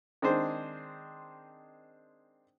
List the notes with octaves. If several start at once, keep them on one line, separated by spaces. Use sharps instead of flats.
D#3 G#3 C4 D4 G#4 C5